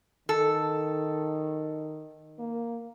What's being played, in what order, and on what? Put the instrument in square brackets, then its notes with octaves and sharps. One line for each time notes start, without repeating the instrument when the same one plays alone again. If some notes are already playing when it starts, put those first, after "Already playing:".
[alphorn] D#3 [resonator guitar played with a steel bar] A4
[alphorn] A#3